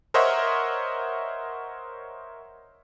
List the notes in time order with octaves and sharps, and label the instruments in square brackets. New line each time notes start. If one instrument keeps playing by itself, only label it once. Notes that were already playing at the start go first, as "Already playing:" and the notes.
[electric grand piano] A#4 C5 C#5 D#5 E5 F#5